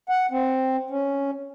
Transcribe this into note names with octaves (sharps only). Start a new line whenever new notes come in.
F#5
C4
C#4